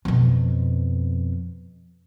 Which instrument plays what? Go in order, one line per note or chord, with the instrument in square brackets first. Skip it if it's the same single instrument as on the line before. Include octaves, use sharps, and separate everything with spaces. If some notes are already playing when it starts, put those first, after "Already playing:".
[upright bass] F2 B2